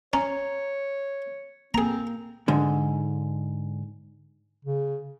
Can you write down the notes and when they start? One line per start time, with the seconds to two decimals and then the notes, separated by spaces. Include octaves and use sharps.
0.13 C#4 C#5 A#5
1.74 A#3 C4 G#4 A#5
2.48 G#2 D3
4.65 C#3